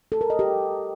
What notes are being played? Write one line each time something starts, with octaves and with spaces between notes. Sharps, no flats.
A4
A#4
D#5
G4